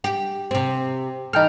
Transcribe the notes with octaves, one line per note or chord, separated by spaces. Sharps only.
G4
C3 C4
E3 D#4 A4 G5 F6